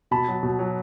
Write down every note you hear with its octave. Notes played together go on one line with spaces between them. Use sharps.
B2 A5 B5
F#3
B2
F#3